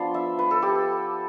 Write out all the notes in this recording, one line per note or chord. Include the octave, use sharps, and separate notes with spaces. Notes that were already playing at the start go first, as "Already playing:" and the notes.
Already playing: F3 B3 D4 C6
E5
B4
A4
G4